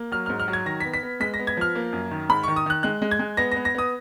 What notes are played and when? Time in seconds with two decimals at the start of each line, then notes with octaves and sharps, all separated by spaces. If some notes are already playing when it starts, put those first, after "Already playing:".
Already playing: A#3
0.12 F#3 F6
0.26 G#2 F6
0.40 F6
0.48 F#3
0.53 G#6
0.66 D#3 A#6
0.80 B6
0.85 B3
0.94 B6
1.03 B3
1.20 G#3 B6
1.34 A#6
1.39 B3
1.47 G#6
1.57 F3 F6
1.75 A#3
1.93 F#2
2.11 D#3
2.29 G#2 B5
2.43 D#3 C#6
2.56 D#6
2.66 D#3 F#6
2.83 G#3 F#6
3.02 G#3
3.11 G#6
3.19 G#3
3.37 B3 A#6
3.52 A#6
3.56 B3
3.65 A#6
3.75 B3 D#6